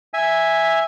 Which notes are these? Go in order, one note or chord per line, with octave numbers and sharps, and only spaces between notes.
E5 G#5